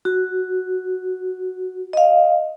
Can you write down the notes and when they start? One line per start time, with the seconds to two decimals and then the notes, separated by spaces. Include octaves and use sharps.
0.05 F#4
1.93 D#5 F5